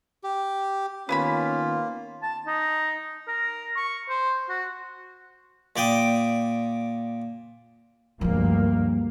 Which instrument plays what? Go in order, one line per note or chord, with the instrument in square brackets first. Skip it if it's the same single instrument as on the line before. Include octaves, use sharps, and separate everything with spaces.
[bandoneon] G4
[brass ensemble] D#3 B3 F4 [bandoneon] A#3 [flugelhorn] C#4 [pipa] B4 G#5 B5
[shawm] A5
D#4
A#4
C#6
C5
F#4
[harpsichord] A#2 D5 G5 D#6
[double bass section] D2 G2 A#3 [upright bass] F3 G#3